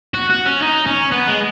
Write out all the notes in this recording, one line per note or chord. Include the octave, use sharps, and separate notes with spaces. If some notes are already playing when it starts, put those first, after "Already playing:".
F#4
F#4
C#4
D#4
C#4
B3
G#3